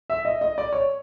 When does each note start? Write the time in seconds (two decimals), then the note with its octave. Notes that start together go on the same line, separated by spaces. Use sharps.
0.10 E5
0.25 D#5
0.41 D#5
0.58 D5
0.73 C#5